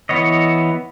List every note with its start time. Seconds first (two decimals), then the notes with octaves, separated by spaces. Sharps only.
0.09 E3 B3 C#5 D#5